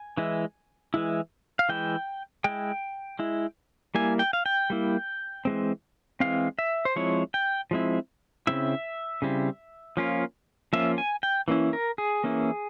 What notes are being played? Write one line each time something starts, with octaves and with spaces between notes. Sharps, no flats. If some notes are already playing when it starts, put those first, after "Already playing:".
Already playing: G#5
E3 G#3 E4
E3 G#3 E4
F5
E3 G#3 E4 G5
G#3 E4 G5
G#3 E4
G3 A#3 E4 G#5
G5
F5
G5
G3 A#3 E4
E3 G#3 C4
E3 G#3 C4 F5
E5
C5
F3 G#3 C4 E4 C#5
G5
F3 G#3 C4 E4
C#3 G3 C4 E4 E5
C#3 G3 C4 E4
F3 A#3 C#4 F4
F3 A#3 C#4 F4 E5
G#5
G5
E3 A#3 C#4 E4
A#4
G#4
E3 A#3 C#4 E4